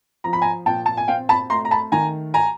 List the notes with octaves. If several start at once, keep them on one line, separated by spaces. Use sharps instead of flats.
F3 A#5
B5
G#5 A#5
A#2 G5 A5
A5
G#5
C4 F5 G5
A5 B5
A3 A#5 C6
A#5
A5 B5
D#3 G#5 A#5
G#5 A#5